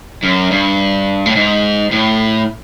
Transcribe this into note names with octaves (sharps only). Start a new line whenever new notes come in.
F#2
G2
A2
G#2
A2